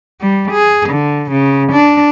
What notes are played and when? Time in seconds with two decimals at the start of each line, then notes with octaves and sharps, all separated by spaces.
0.20 G3
0.51 G#4
0.89 D3
1.31 C#3
1.73 D4